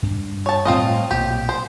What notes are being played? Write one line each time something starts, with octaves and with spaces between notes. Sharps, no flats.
G2 D4
C#5 A5
A2 G3 A3 C4 F4 D#5
B1 A#2 A#3 G4
C5